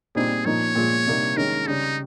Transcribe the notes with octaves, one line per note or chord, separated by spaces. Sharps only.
A#2 G3 C4 D#4 G#4
A#2 F3 A#3 D#4 C#5
A#2 F3 G#3
C3 G3 A#3 D#4
D#3 G#3 C#4 A#4
C#3 G3 C#4 D#4